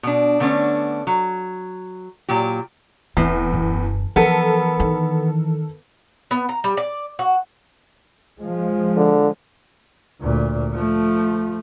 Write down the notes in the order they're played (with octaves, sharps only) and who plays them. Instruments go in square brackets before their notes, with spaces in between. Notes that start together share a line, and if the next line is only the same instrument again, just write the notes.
[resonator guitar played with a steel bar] B2 D4
D3 A3 B3 C#4 D4
F#3
A#2 F#3 G4
[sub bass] E1 [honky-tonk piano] E2 [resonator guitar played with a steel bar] A2 [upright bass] C4
[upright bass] F#2
[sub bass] E3 [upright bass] F3 [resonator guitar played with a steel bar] B3 [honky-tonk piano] A4 A#4
[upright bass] D#3
[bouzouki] B3
A#5
G3
D5
F#4
[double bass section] F3 G#3
[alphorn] D3
[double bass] D2 A#2
F3 A3